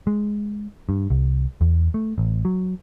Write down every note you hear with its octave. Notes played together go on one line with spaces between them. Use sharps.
G#3
G2
C2
E2
A3
A1
F#3